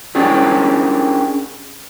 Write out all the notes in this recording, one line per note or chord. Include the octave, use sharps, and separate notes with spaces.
C#4 D4 G4 G#4 A#4